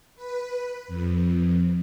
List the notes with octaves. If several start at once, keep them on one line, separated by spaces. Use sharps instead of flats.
B4
F2